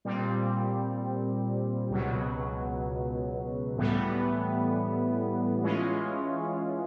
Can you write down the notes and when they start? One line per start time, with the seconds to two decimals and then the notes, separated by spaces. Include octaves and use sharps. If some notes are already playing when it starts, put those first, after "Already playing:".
0.05 A#2 G3 C4
1.90 C#2 B2 F#3
3.77 A2 E3 G3 B3
5.62 E3 G#3 C#4 F4